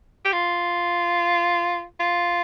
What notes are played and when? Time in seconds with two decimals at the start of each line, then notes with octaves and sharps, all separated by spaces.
0.25 G4
0.33 F4
2.00 F4